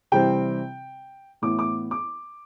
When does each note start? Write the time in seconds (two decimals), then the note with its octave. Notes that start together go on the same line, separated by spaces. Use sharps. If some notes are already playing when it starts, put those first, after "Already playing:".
0.12 C3 E3 G3 C4 G5
1.42 A2 E3 B3 D6
1.59 D6
1.91 D6